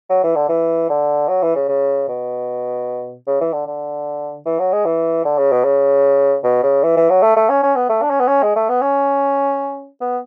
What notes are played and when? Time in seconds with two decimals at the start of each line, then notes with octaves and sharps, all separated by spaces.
0.10 F#3
0.24 E3
0.36 D3
0.49 E3
0.89 D3
1.28 F#3
1.42 E3
1.56 C#3
1.68 C#3
2.08 B2
3.27 C#3
3.41 E3
3.53 D3
3.67 D3
4.46 E3
4.59 F#3
4.73 G#3
4.85 E3
5.25 D3
5.38 C#3
5.52 B2
5.64 C#3
6.44 B2
6.63 C#3
6.83 E3
6.97 E3
7.10 F#3
7.23 A3
7.36 A3
7.49 C#4
7.63 C#4
7.76 B3
7.89 A3
8.02 D4
8.10 C#4
8.20 B3
8.28 C#4
8.43 G#3
8.56 A3
8.69 B3
8.82 C#4
10.01 B3